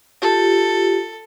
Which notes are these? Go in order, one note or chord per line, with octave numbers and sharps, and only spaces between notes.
F4 G4 A4